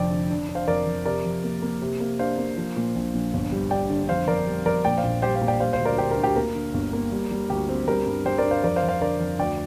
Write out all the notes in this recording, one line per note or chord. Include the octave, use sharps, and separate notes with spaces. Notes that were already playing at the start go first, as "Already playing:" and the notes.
Already playing: F1 F2 D3 D5 G5
D3
D4
D4
C5 F5
F2 A#4 D5
F2
C3 A#4 D5
F2
A#3
A#3
C3
A#3
D4 C5 F5
A#3
F3
A#2
A#1
A#1
G1
G3
G3 D5 G5
D3
F2 C5 F5
F2 A#4 D5
G3
F2 A#4 D5
A#2 D5 G5
C5 F5
A#1
G3 G4 C5
C5 F5
A#2
D5 G5
G3 C5 F5
C5 F5
D2
A#4 D5
D3 G4 C5
A#4
D2
G4
A#3 A#4
D3
G1
A#3
G3
G3
D2 G4
C4
G3 A#4
G2
G3 G4 C5
A#4 D5
D4
C5 F5
F2 A#4 D5
C5 F5
F2
C5 F5
D3 A#4 D5
F2
D2 D5 G5